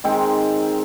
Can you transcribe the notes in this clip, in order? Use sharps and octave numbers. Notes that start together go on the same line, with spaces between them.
D#3 G#3 C4